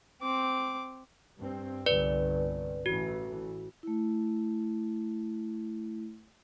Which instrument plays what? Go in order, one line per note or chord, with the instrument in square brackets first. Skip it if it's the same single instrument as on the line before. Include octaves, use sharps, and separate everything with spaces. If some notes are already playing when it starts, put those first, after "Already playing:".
[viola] C4 D6
[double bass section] G2 C4
[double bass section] G1 C2 G2 [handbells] B4 D5
[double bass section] A1 E3 A3 [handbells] F#4
[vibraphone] A3 E4